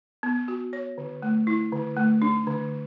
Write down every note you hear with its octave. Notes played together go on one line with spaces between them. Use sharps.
B3
F#4
C#5
D3
A3
E4
D3
A3
D4
D3